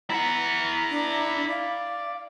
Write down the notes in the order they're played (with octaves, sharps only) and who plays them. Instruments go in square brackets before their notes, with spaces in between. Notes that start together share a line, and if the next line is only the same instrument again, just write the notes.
[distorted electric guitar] E4 F#5 [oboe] A#5
[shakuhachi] D4
[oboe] D5 [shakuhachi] F5